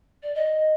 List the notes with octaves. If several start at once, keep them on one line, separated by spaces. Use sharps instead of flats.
D5
D#5